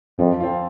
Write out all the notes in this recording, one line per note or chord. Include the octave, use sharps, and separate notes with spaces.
F2 F3
C4 F4